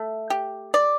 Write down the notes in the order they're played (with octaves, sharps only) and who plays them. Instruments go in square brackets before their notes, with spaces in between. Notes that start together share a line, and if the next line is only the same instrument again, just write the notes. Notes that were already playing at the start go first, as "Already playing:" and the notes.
Already playing: [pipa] A3
G4
D5